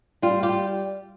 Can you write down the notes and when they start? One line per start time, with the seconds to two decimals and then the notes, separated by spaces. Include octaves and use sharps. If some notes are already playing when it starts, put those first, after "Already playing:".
0.22 G3 F4
0.43 F4 G4